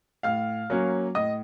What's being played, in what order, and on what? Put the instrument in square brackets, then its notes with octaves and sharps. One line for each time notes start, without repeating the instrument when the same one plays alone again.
[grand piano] A2 F5 F6
F#3 A#3 C#4
A2 D#5 D#6